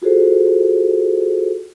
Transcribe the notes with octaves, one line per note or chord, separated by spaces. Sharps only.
F4 F#4 G#4 A4 C5